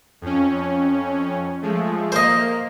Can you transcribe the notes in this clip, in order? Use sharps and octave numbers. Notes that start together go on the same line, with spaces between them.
F2 C#4
F3 G#3 A3
A#3 C5 D#5